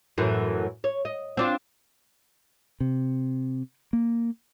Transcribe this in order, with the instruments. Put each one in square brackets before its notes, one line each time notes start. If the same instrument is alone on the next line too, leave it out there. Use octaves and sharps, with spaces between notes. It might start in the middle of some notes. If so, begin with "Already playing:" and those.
[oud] F#2 A2 E3
C#5
D#5
C4 D4 F4
[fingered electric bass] C3
A#3